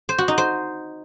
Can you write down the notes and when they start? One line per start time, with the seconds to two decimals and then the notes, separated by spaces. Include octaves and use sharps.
0.09 C5
0.18 F#4
0.28 D#4
0.38 C5